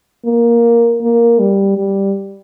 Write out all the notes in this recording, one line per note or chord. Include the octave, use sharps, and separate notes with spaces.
A#3
A#3
G3
G3